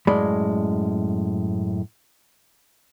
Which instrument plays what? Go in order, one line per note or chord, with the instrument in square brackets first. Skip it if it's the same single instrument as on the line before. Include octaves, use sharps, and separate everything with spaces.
[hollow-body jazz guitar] F#2 A2 G#3 D5 B5